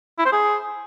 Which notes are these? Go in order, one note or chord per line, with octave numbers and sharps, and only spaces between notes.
E4
C5
G#4